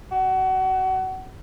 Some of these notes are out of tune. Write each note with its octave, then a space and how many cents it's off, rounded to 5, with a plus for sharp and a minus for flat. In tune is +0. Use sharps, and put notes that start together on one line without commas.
F#4 +30